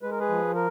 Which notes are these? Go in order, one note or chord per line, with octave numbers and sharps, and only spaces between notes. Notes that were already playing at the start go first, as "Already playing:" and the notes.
G#3 B4
A#4
G#4 B4
F3
A#4